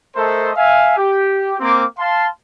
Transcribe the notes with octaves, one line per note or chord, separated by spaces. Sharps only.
A3 A4 A#4 C5 D#5 C6
E5 F5 G#5
G4
A#3 C4 D6
F5 A5 C6